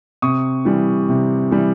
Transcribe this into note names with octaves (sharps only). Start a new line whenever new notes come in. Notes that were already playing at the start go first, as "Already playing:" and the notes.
C3 C#6 D#6
E3 G3
C3
E3 G3